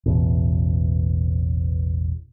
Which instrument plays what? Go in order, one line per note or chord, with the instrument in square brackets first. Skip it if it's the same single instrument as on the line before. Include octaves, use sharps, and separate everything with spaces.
[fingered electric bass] A1 E2 B2